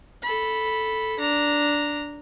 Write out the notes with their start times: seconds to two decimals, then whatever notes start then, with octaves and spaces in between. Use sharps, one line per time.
0.22 A4 B5
1.20 D4 A#5